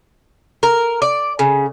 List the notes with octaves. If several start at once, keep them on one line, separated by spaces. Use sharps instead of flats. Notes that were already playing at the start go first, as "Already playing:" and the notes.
A#4
D5
C#3